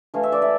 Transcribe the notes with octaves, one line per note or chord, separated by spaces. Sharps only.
E3 A3 E4 F5
E5
D5
E5